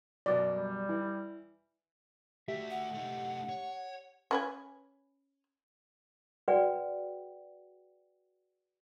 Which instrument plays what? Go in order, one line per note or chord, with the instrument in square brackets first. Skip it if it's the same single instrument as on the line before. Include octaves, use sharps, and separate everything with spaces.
[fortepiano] F#2 B2 [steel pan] D5
[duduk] G3
[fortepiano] E3
[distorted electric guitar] A3 F#4 [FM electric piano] G4 [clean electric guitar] E5
[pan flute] F#5
[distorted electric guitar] A3 D#4
C#5
[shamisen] C#4 B4 G#5
[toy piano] F#4 G#4 B4 D5 F#5 G5